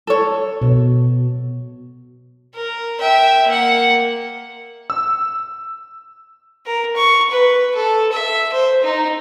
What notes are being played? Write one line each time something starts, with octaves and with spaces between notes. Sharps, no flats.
A4 C#5
B2
A#4
E5 G5
A#3 F#5
E6
A#4
C#6
B4
A4
E5
C5
D#4